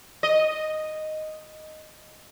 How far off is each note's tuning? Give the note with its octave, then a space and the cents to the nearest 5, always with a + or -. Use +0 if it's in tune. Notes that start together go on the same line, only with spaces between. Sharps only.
D#5 -5